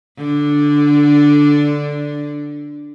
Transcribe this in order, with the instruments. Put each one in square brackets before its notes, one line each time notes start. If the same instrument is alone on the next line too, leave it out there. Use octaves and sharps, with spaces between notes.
[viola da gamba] D3 D4